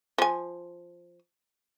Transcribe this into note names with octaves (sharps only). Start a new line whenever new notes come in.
F3 G#5